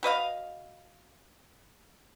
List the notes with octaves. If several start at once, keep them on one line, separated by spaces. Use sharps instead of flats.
F#4 B4 D#5 F5